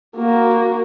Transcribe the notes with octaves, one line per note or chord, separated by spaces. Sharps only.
A#3 F#4